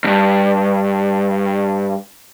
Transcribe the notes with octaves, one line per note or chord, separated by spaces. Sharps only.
E2 G2